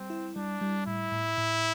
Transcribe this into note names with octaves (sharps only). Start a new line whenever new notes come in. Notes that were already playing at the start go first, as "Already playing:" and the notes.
Already playing: G3 C4
E4
G3 D4
G3
A2 E4
A2
A2